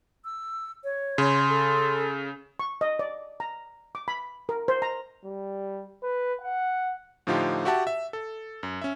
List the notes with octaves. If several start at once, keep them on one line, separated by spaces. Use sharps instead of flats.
E6
C#5
C#3 C6
A4
C#6
D#5
D5
A#5
D6
B5
A#4
C5
A#5
G3
B4
F#5
A2 D3 F3 D#4 F4 G4
F#4 G4 E5 F#5 A5
E5
A4
F#2
C#4 E5